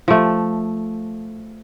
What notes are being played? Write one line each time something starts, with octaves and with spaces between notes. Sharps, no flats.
F3 A3